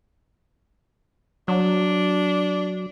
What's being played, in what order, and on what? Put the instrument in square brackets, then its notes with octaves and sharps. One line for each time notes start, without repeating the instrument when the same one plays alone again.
[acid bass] F#3 [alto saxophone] D4